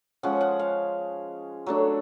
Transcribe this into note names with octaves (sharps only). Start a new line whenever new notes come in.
F3 G#3 C#4 F#5
F#5
F5
F#3 A3 D4